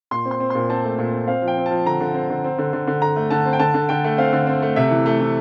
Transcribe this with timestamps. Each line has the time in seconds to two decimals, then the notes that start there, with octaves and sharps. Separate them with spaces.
0.11 A#2 C6
0.25 C4
0.31 C6
0.40 C4
0.50 A#2 C6
0.70 C4 A5
0.84 A3
0.98 A#2
1.13 C4
1.27 C4 F5
1.42 F3
1.48 G5
1.57 C4
1.66 F3 A5
1.86 D3 A#5
2.00 D3
2.14 C4
2.30 D3
2.44 C4
2.58 D3
2.73 D3
2.87 D3
3.02 D3 A#5
3.16 A3
3.31 D3 A5
3.45 C4
3.53 G5
3.59 D3 A5
3.74 D3
3.89 D3 G5
4.04 A3
4.18 C4 F5
4.33 D3
4.47 C4
4.62 A3
4.76 C3 E5
4.91 E3
5.06 A3
5.20 E3